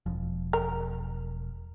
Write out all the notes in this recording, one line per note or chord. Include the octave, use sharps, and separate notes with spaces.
E1 F3
A#4